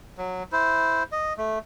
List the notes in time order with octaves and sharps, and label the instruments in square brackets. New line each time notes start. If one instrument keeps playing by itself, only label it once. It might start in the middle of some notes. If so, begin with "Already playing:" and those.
[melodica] F#3
E4 C5
D#5
A3